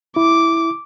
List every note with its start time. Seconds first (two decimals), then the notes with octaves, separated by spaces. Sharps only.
0.16 E4 D6